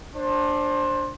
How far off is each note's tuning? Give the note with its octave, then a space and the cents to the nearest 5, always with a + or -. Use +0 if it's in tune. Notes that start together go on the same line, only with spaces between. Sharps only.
D4 +0 C5 +20